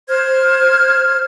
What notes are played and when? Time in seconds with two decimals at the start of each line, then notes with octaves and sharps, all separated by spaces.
0.08 C5 F6 G#6